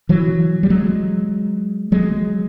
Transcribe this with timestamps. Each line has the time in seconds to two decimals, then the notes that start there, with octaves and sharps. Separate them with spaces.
0.09 E3 F#3
0.63 G3
0.70 F#3 G#3
1.92 F#3 G#3